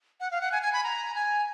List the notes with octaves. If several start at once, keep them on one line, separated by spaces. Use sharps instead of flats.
F#5
F5
F#5
G#5
G#5
B5
A#5
G#5